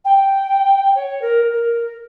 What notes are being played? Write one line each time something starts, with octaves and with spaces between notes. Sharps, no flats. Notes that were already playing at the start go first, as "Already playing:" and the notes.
G5
C#5
A#4
A#4